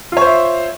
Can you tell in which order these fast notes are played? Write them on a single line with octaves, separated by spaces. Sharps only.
F4 C#5 C5 E5